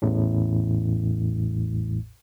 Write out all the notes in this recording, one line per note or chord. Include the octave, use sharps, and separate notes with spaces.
A1 E2 A2